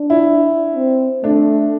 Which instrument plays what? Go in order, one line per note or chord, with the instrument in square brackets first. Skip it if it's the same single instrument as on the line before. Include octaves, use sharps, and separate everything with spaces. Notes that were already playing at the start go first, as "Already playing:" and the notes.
Already playing: [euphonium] D4
[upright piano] E4
[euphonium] C4
[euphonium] A3 [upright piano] D4